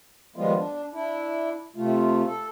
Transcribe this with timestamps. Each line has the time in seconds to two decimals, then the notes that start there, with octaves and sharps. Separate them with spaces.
0.36 D#3 F3 G3 G#3 B3 F4
0.56 D4
0.93 D4 E4
1.76 C3 A3 F4
2.26 A4